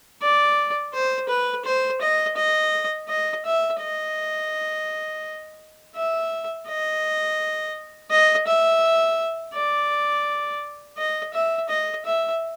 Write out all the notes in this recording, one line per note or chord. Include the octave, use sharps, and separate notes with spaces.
D5
C5
B4
C5
D#5
D#5
D#5
E5
D#5
E5
D#5
D#5
E5
D5
D#5
E5
D#5
E5